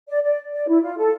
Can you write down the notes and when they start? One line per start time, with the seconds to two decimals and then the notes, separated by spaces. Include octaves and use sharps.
0.08 D5
0.23 D5
0.52 D5
0.67 E4
0.82 F4
0.97 A4